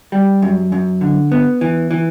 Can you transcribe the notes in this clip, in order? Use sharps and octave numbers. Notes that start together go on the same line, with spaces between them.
G3
F#2
F#2
D3
B3
E3
E3